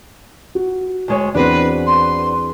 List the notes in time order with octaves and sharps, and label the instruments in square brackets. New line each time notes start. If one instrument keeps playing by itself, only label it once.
[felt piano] F#4
[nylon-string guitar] D2 G#3 C#5
[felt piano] E2 C4 [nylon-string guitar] D4 F#4 C5 [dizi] B4
[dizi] C6